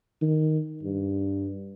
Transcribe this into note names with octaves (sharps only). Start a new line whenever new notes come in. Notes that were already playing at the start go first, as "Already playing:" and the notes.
D#3
G2